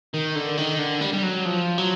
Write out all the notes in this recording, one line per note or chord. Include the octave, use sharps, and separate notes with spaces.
D#3
D3
D#3
D3
G3
G3
F#3
F3
F#3